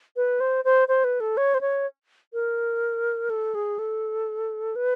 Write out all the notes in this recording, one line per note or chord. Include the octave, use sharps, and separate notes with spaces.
B4
C5
C5
C5
B4
A4
C#5
C5
C#5
A#4
A4
G#4
A4
B4